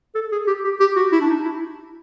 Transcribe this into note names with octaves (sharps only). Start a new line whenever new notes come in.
A4
G#4
G4
G4
G4
F#4
E4
D4
D#4
E4